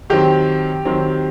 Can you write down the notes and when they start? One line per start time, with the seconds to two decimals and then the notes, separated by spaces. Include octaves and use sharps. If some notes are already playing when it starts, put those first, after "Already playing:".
0.10 D#3 F#3 C4 G4
0.85 D#3 F#3 C4